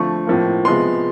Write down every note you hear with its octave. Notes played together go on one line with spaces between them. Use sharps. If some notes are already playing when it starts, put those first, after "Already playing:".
Already playing: D3 F3 A3 C#6
A2 F3 A#3
C3 F3 G#3 B3 C6